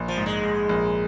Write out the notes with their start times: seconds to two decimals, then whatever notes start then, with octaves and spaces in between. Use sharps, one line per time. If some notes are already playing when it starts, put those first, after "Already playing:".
Already playing: A#1
0.08 F3
0.17 G#2
0.26 G#3
0.43 G#2
0.69 A#1